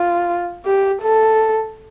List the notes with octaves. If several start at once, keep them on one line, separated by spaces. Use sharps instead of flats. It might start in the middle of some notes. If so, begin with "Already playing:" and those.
Already playing: F4
G4
A4